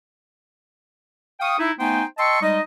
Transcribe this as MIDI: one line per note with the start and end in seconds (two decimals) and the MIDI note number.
1.40 1.57 77
1.40 1.57 79
1.40 1.57 85
1.40 1.57 87
1.59 1.71 63
1.59 1.71 64
1.79 2.03 57
1.79 2.03 59
1.79 2.03 63
1.79 2.03 72
1.79 2.03 79
1.79 2.03 80
2.18 2.41 75
2.18 2.41 79
2.18 2.41 81
2.18 2.41 84
2.18 2.41 85
2.18 2.41 88
2.41 2.60 55
2.41 2.60 56
2.41 2.60 63
2.41 2.60 75